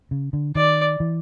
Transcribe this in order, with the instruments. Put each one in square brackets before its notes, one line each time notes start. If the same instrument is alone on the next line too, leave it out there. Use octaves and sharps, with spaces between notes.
[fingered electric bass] C#3
D3
[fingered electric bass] D#3 [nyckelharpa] D5
[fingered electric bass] E3